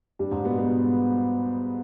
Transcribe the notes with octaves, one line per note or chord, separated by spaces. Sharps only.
G2 G3
G#2 G#3
B2 B3
B2 B3